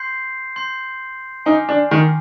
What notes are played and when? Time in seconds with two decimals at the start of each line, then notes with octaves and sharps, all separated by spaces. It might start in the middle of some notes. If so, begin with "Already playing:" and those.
Already playing: C6 G6 C7
0.56 C6 G6 C7
1.46 D#4 G#5 D6 F6
1.69 D4
1.91 D#3